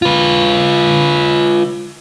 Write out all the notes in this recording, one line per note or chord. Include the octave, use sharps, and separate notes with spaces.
F4 B4